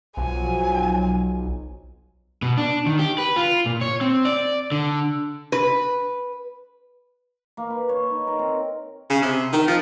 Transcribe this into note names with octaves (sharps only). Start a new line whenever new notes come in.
B1 F3 F#3 G#5
B2
D4
D#3
G4
B4
F4
A#2
C#5
C4
D5
D3
B4
A#3
B4
C#5
D#4
A#4
C4
C#3
C3
D#3
F3